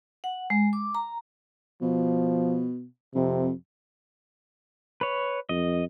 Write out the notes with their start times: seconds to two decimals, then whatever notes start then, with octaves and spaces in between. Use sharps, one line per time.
0.24 F#5
0.50 G#3
0.73 D6
0.95 A#5
1.82 B2 F3
3.15 F2 C3
5.01 B4 C#5
5.49 F2 D#5